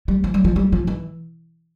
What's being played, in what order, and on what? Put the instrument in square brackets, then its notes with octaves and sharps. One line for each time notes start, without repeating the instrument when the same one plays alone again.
[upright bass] G3
F3
G3
F3
G3
F3
E3